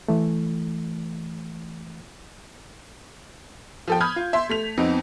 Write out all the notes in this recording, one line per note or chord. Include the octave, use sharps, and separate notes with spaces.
E3 A3
F3 A4 G5
B5 D#6 F6 G6 G#6
F4
E5 C6
A3 B6 F7
F2 B3 C4 D#4